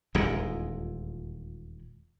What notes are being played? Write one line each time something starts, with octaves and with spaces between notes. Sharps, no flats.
D#1 E2 A#2 G#3